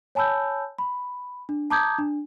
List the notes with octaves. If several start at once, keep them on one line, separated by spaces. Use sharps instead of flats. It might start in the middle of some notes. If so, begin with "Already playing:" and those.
C#5 G#5 A5 B5 E6 G6
B5
D4
A5 A#5 D6 D#6 G6 G#6
D4